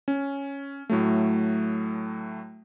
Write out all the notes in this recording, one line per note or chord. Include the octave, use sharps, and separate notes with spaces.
C#4
A2 F#3 A3